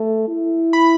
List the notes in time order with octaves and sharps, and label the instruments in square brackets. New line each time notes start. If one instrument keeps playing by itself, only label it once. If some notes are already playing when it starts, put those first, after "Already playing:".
Already playing: [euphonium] A3
E4
[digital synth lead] B5